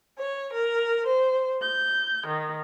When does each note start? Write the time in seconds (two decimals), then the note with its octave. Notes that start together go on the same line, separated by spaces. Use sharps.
0.19 C#5
0.53 A#4
1.06 C5
1.60 G6
2.26 D#3